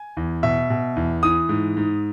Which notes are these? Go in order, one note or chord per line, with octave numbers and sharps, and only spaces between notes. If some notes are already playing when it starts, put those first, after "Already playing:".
Already playing: G#5
E2
B2 E5
B2
E2
E3 D#6
G#2
G#2